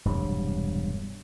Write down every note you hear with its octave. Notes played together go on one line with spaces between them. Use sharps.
E1 G2 C3 F#3